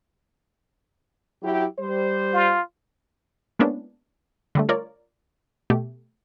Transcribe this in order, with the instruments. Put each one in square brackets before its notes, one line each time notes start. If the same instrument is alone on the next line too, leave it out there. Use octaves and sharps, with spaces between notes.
[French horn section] F#3 E4 G4
G3 C5
[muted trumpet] F4
[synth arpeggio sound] G#3 A#3 B3 C#4 D4 E4
D3 G3 A3
F4 A#4 C#5 D5
B2 A3 G4